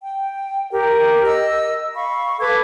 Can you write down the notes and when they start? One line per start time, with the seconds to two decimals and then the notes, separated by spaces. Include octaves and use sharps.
0.02 G5
0.71 G4 A#4
1.24 D#5 E6
1.95 F5 B5 C#6
2.39 A4 B4 D6 G#6